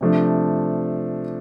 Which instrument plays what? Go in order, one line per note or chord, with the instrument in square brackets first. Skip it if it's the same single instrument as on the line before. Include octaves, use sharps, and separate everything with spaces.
[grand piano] C3 F3 A3 D4